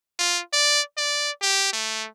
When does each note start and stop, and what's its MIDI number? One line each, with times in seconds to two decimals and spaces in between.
0.19 0.41 65
0.53 0.81 74
0.97 1.31 74
1.42 1.71 67
1.73 2.07 57